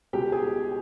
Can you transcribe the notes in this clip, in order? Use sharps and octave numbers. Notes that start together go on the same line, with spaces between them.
C#2 B2 G4 G5
G#4 G#5